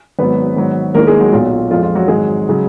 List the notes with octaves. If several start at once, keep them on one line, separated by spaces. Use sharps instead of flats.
G#1 G#2 F#3 B3 B4
G#1 G#2 F#3
D#2 D#3 G#3 A#3 A#4
G#3 G#4
F#3 F#4
B1 A#2 F#3 F4
F4
F2 F3 G#3 F4
F4
F#3 F#4
G#1 G#2 F#3 G#3 G#4
C#3 F#3